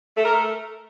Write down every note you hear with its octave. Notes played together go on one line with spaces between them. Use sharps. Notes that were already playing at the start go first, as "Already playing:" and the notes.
A3
A#4
A3